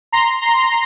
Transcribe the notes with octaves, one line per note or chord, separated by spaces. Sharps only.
A#5 C6
A#5 C6